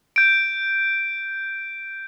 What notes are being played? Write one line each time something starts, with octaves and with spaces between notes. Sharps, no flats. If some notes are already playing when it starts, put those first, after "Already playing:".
G6 D7